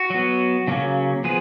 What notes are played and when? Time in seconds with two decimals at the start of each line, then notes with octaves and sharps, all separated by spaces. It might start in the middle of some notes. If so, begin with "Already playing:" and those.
Already playing: F#4
0.10 F#3 B3
0.67 C#3 F#3 A#3 C#4
1.24 F3 B3 G#4